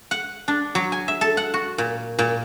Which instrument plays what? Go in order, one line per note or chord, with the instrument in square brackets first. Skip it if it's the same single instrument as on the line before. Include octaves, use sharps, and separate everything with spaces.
[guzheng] F#5
D4
F#3
G#5
E5
A4
F#5
F#4
A#2
A#2